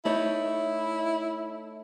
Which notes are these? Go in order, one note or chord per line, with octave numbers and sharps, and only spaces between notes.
A3 D#4 E4 C#5